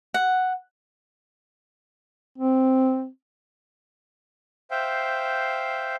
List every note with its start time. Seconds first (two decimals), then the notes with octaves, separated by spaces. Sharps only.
0.14 F#5
2.38 C4
4.71 C5 E5 F5 G5